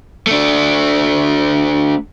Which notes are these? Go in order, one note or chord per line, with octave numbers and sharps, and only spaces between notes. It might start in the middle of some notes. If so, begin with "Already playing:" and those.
A3 D4